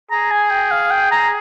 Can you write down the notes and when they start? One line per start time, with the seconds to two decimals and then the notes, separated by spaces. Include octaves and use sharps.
0.11 G#4 A#5
0.31 G#5
0.50 G5
0.71 F5
0.91 G5
1.12 A#5